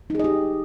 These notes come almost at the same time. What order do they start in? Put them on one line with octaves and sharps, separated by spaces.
D#4 G#4 D#5 G4